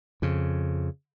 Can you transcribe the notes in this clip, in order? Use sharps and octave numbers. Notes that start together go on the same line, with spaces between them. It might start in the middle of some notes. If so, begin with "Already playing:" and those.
F2 C#3